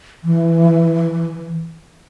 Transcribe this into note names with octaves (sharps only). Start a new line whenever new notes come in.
E3